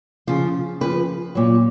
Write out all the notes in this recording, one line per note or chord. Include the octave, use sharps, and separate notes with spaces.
C#3 F3 F4
C#3 F3 B4
A#2 F#3